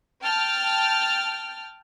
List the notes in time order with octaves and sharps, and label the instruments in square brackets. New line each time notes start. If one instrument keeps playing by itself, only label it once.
[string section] G5 A5 F6